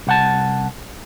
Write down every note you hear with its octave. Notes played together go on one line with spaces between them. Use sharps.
C2 F#5 A5